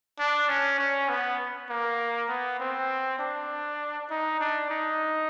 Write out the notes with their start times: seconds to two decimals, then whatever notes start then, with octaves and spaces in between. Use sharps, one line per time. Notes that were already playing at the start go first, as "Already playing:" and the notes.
0.19 D4
0.49 C#4
0.79 C#4
1.09 B3
1.70 A#3
2.29 B3
2.60 C4
3.19 D4
4.10 D#4
4.40 D4
4.70 D#4